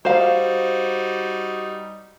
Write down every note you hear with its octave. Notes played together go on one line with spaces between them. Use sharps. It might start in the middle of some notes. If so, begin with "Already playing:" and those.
G3 D#4 F#4 C5 F5